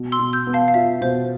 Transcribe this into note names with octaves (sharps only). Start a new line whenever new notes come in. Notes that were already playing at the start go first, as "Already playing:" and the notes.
Already playing: B2
C6 E6
B2
E6 G6
B3
F5 A5
F5
F4 E5
B2 C5